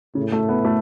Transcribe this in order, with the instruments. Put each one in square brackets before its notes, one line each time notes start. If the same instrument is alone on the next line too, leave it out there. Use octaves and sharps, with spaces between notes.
[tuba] A2 [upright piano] C#3
[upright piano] A3
B3
A3